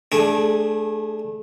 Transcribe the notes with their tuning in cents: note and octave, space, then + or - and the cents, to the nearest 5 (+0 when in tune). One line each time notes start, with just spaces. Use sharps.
A3 -25 D4 +0 G#4 +0